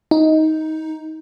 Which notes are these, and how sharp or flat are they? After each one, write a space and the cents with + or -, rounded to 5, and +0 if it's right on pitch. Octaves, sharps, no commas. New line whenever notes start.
D#4 +15